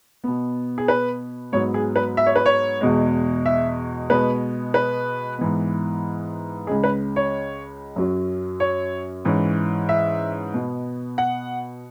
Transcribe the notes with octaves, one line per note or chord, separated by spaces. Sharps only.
B2 B3
G#4
B4
G#2 F#3 B3 C#5
G#4
B4
E5
C#5
B4
C#5
E2 B2 G#3
E5
B2 G#3 B3 B4
B4
G#2 E3 B3
C#2 C#3 G#3 G#4
B4
C#5
F#2 F#3 C#4
C#5
G#2 E3 C#4
E5
B2 B3
F#5